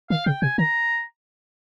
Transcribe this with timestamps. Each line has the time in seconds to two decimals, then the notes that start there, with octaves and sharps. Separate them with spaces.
0.10 D#3 F5
0.26 C#3 G5
0.42 C3 G#5
0.58 D#3 A#5